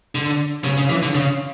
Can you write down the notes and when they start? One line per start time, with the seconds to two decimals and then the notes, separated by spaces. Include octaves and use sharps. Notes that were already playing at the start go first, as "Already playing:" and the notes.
0.15 D3
0.64 C#3
0.77 C#3
0.89 E3
1.02 D3
1.15 C#3